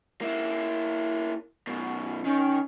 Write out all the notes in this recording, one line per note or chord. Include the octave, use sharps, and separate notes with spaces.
A#3 E4
F#2 B2
D#3 C#4